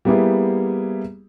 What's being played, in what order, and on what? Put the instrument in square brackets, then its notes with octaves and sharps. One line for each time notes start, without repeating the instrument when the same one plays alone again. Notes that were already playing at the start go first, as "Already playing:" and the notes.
[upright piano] G3 A#3 B3 E4 G4 G#4